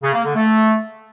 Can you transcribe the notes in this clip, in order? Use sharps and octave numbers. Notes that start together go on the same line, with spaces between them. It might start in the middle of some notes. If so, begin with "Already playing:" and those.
C#3
A#3
D3
A3